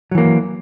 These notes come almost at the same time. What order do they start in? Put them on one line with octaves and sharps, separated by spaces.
F#3 E3 A#3